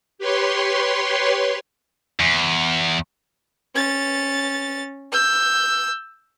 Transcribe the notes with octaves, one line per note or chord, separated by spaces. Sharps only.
G4 B4 C#5 C6
E2
C#4 A6
E6 G6